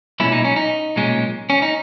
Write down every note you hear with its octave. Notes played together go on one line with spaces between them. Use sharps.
B1 A#2 G#3 C#4 E4
D#4
C#4
D#4
B1 A#2 G#3 C#4
C#4
D#4